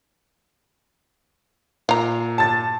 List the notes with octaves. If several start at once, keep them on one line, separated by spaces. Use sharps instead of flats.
A#2 F5 A#5
A5 A6